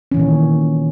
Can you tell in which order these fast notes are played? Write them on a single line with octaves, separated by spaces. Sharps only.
C#4 E3 A#2 D#3